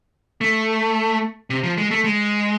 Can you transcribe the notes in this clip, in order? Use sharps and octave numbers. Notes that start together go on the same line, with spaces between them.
A3
C3
F3
G#3
A3
G#3